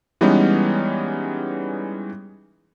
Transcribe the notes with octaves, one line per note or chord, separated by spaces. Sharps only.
E3 G3 G#3 B3 C#4 D#4